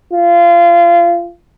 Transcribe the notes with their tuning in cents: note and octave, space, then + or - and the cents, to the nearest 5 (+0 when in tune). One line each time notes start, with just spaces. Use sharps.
F4 -25